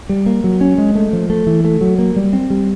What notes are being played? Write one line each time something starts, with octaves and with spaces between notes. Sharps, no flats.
G3
A#3
F#3
C#4
G#3
A3
F3
A3
E3
A3
F#3
A#3
G3
C4
G3